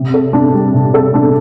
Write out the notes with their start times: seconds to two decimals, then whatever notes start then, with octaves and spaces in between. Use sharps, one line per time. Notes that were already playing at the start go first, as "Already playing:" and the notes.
Already playing: C3
0.14 A4
0.33 D4
0.53 G3
0.74 C3
0.94 A4
1.14 D4